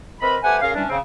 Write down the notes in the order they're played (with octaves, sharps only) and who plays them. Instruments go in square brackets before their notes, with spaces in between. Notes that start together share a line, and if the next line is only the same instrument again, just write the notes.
[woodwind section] C4 A#4 B4 D#5 B5
A3 G4 B4 C5 F#5 G#5
C#4 G#4 A#4 F5
E3 G3 C#4 D4
C#3 C4